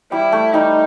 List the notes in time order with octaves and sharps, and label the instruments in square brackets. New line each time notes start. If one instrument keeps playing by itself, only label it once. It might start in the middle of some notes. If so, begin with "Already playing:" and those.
[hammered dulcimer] G3 [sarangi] E4
[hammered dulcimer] A3
[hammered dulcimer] G3 [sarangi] D#4